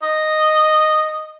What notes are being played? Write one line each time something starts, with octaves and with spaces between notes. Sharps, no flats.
D#5